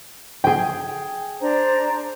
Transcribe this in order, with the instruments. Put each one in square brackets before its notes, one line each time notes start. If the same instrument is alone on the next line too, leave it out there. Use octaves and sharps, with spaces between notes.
[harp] G#4 G5
[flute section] D4 C5 A#5